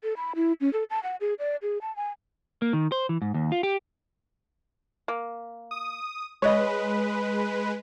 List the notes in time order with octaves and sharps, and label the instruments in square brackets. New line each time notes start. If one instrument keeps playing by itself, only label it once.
[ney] A4
B5
E4
C#4
A4
A5
F#5
G#4
D5
G#4
A5
G#5
[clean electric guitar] A#3
D#3
C5
E3
G#2
D#2
F4
G4
[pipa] A#3
[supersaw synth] D#6
[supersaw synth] G#3 B4 [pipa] C#5 D#5